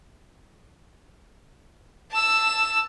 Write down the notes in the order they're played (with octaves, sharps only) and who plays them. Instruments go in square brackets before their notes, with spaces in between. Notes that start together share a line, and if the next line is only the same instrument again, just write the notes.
[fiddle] A5 E6